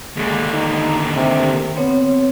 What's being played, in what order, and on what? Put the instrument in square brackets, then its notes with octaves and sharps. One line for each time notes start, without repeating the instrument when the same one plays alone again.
[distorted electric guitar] D#2 D3 [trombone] G#3
[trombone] D#4
C3
[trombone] B3 [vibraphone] C4 C#5